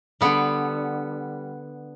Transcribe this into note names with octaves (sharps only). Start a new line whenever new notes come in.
D3 G3 B3